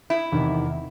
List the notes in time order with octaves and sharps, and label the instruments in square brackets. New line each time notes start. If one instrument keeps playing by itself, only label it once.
[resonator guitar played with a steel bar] E4
[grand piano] E2 C3 D#3